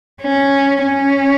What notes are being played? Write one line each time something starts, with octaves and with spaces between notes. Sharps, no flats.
C#4
C#4